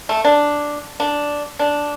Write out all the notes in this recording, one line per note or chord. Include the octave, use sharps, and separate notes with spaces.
A3
D4
D4
D4